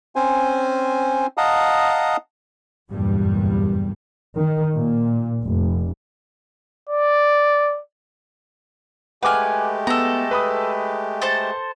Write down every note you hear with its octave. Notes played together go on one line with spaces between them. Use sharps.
C4 C#4 C5 G#5
D#5 F5 F#5 A5 A#5 D#6
F#1 E2 G2 A#2 G3
D#3
A#2
F1
D5
G#3 A3 G4 B4 F#5 G#5 D6 F6
B3 A4 A#5
B4 B5 D#6
A4 C5 A5